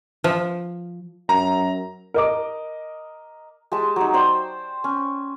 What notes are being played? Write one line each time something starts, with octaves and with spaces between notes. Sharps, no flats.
F3
F#2 A#5
A#4 D#5 D6
G#3 G4 A5
F#3 D#4
C5 D5 G5 A5
C#4